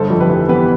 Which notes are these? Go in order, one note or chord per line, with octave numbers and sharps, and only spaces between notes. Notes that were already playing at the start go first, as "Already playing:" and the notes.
Already playing: G1 A4 C5
F2
G4 B4
E3
B3 G4 B4